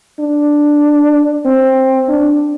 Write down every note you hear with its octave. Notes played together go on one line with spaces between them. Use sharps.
D4
C4
D4